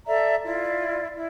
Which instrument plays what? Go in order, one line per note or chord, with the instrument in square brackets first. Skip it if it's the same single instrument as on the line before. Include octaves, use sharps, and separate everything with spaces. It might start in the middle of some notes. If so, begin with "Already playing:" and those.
[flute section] A4 D5 E5 A#5
E4 F4 D5
E4